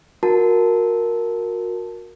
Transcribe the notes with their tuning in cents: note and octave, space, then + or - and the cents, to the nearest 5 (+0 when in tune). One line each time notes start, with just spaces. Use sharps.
F#4 -25 A#4 +0 A5 +0